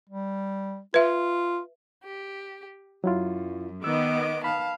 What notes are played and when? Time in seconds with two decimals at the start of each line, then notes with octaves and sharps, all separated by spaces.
0.09 G3
0.94 F4 B4 E5
2.04 G4
3.04 F#2 F#3 E4 F4
3.84 D#3 B3 D#5 D6 E6
4.44 F5 A5 B5